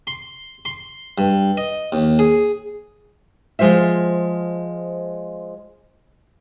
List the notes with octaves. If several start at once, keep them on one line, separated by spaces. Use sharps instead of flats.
C6
C6
G2
D#5
D#2
G#4
F3 G#3 F4 C5 E5